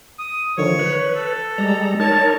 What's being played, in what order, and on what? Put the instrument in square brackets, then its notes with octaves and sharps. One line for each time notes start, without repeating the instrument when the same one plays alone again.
[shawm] D#6
[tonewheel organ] D3 D#3 F3 [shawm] C#5
[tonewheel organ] B4
[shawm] A4
[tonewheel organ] G3 G#3 A#5
[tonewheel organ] D#4 A#4 C#5 [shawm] A5